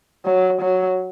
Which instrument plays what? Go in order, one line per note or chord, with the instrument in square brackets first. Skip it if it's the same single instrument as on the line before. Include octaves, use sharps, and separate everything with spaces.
[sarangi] F#3
F#3